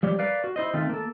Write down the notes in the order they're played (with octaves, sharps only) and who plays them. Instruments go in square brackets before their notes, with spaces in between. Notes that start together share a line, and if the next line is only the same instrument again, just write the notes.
[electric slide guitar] F3 G3 G4 C#5
A#4 B4 D5 F5
F#4
E4 C5 D#5
D#3 A3 C4 F4
A#3 A4